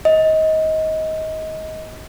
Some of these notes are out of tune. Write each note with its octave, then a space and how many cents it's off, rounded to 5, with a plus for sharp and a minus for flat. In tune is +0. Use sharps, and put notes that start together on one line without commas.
D#5 +25